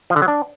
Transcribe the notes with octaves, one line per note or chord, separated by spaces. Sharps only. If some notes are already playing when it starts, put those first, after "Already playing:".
F3
D3
F#3
D4